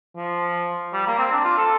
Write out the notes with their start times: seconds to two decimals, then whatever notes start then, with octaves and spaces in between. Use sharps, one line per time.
0.16 F3
0.93 G3
1.06 A#3
1.19 C4
1.32 D4
1.45 F4
1.58 A4